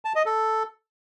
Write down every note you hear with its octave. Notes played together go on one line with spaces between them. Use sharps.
A5
D#5
A4